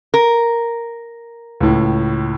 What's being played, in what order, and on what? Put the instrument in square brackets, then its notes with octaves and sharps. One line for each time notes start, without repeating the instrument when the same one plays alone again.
[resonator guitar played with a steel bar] A#4
[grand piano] C#2 A2